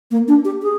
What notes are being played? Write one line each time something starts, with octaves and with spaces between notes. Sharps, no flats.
A#3
D4
G4
G#4